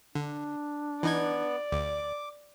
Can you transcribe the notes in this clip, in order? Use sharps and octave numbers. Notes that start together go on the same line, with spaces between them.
D3 D4
E3 B3 D#4 D5 G#6
D2 D6